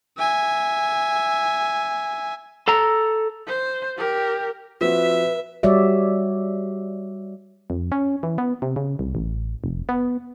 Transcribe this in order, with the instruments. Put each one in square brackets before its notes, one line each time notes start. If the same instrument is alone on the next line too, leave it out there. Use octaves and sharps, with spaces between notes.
[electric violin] E5 G#5
[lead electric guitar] A4 A#5
[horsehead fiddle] C5
G4 A#4
[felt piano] F3 C4 F#4 [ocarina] B4 [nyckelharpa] E5
[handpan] G3 F#4 C#5 D5 E5
[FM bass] F2
C#4
E3
B3
C3
C#3
C2
A1
F1
B3